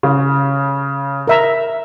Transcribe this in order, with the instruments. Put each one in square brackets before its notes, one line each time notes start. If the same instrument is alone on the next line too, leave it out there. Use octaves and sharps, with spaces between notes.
[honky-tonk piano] C#3
[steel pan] A#4 E5 A#5